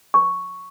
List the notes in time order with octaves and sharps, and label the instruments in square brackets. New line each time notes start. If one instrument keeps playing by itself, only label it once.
[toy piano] C#6